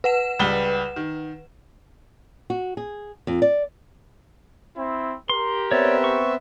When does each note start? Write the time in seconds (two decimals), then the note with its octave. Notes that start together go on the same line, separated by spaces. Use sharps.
0.04 B4 F#5 E7
0.39 C#2 G3 G7
0.96 D#3
2.50 F#4
2.77 G#4
3.27 F2
3.42 D5
4.77 C4 E4
5.30 G4 A#4 C6
5.72 B3 C4 C#5 D5 E5
6.04 C#6